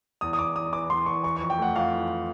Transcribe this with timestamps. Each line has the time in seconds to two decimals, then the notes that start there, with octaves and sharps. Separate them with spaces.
0.21 E2 D#6
0.33 D#6
0.38 E2 D6
0.56 E2 D#6
0.72 E3 D6
0.90 E2 C6
1.06 E2 C#6
1.23 E3 C#6
1.37 F2 C#6
1.50 G5
1.58 A3 F#5
1.76 F2 F5
1.92 E3